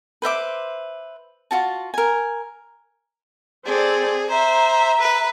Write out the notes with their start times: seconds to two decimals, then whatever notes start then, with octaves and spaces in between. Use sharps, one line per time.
0.22 B4 C5 E5 D6
1.51 F4 F#4 A5
1.94 A#4 G#5
3.66 C4 G#4 A4 D5
4.30 C5 E5 A#5
4.99 B4